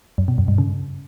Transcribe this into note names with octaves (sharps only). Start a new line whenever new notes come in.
F#2
B2
F#2
G2
C#3